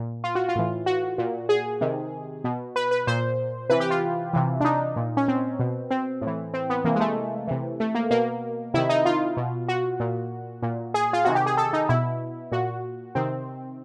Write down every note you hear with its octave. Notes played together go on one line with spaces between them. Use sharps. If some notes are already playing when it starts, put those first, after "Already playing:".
Already playing: A#2
F4
F#4
F4
A2 E3
F#4
A#2
G#4
C3 D#3
B2
B4
B4
A#2 C5
C3 E3 B4
G4
F4
C3 E3
D4
D#4
A#2
C#4
C4
B2
C4
A2
E3
C4
B3
C3 E3 A#3
G#3
A3
C3 E3
A3
A#3
B2 A#3
C3 D#3 E4
D#4
F4
B2
F#4
A#2
A#2
G#4
F4
C3 D#3 F#4
G4
G#4
A4
D#4
B2 E4
A#2 F#4
C3 D#3 C4